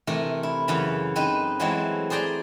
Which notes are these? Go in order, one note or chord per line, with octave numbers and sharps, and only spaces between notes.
C3 E3 A3 A#4
E4
F#2 C#3 E3 B5
C4 D#4 B4 D#5
E3 F#3 G#3 A3 C4 E4
G#4 C5 D5 G5 A#5